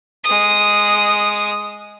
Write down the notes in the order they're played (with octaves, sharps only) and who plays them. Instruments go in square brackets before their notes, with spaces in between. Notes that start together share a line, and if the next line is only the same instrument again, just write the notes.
[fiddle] G#3 D#6